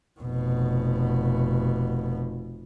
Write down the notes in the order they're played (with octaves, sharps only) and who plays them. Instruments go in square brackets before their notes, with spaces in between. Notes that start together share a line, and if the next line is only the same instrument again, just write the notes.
[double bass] F1 B2